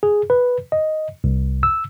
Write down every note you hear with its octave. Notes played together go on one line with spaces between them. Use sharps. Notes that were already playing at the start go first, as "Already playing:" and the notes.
G#4
B4
D#5
C2
E6